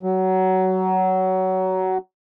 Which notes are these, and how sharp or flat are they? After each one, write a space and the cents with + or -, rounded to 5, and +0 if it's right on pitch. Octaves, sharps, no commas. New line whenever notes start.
F#3 +20